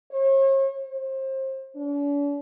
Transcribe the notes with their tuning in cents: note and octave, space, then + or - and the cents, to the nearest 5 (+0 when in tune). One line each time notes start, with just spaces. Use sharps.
C#5 -45
C5 +30
D4 -45